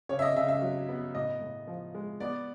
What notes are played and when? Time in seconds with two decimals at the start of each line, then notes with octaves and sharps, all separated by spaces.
0.09 C#3 C#5
0.19 E5
0.22 D#5
0.36 C#3 E5
0.48 E5
0.62 F#3
0.89 B3
1.15 A2 D#5
1.41 A2
1.67 F3
1.95 G#3
2.20 B3 D5